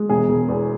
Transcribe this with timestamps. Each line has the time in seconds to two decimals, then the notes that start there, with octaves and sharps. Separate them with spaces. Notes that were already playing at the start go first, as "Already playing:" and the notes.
Already playing: G#3
0.09 E1 G#4
0.29 E1
0.48 E2